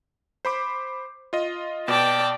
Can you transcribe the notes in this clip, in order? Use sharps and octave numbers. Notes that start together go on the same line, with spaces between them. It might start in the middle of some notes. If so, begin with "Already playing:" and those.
C5 B5 D6
F4 D#5
B2 D5 G5 A5